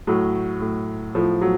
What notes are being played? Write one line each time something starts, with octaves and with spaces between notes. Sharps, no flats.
A2 F#3
A2
A2 F3
F#3